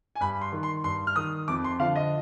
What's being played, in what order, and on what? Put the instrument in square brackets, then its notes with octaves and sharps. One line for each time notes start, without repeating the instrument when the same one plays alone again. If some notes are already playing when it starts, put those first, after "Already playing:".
[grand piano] G#5
G2 B5
C6
D#3
C6
G2 C6
F6
D#3 D#6
F2 D6
C6
D3 F3 F5
D#5